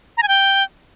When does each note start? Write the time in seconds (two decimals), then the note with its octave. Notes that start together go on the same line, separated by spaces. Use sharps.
0.17 A#5
0.23 G#5
0.28 G5